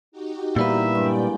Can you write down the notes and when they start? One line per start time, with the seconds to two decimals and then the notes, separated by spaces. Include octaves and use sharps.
0.12 D#4 F#4 G4
0.56 A#2 E3 G3 A#3 B3 B4 E5
0.95 G2 G#3 D5 G5